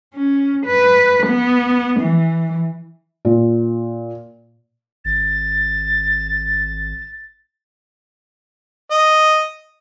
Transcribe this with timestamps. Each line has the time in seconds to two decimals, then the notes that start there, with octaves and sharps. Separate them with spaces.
0.14 C#4
0.66 B4
1.26 B3
2.00 E3
3.25 A#2
5.05 G#1 A6
8.91 D#5